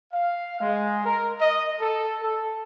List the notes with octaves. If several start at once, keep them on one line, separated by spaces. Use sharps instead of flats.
F5
G#3
A#4
D#5
A4
A4